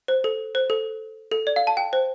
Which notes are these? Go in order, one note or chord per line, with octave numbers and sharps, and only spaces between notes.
C5
A4
C5
A4
A4
D5
F5
A5
G5
C5